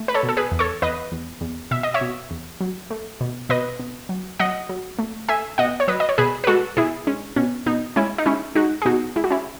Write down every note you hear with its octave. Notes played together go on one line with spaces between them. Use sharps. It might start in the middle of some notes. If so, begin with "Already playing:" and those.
Already playing: A3
B4
A4 C#5
B2
A4
G#4 B4
E2
A4 C#5
E2 B4 D#5
E2
E2
B2 E5
D#5
C#5 E5
B2
E2
F#3
A3
B2
B2 B4 D#5
B2
F#3
F#3 D#5 F#5
F#3
A3
A3 E5 G#5
B2 D#5 F#5
C#5
F#3 B4 D#5
D#5
C#5
B2 G#4 B4
B4
G#3 F#4 A4
B2 E4 G#4
G#3 C#4
B2 C#4
B2 D#4
G#3 C#4 E4
D#4
G#3 C#4 E4
G#3 D#4 F#4
G#4
B2 D#4 F#4
G#3 E4
F#4
C#4 E4